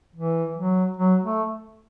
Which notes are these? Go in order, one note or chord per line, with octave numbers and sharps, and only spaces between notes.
E3
F#3
F#3
A3